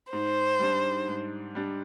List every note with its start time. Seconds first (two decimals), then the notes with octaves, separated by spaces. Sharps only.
0.12 G#2 C5
0.60 G3 D4
1.08 G#2
1.55 G3 D4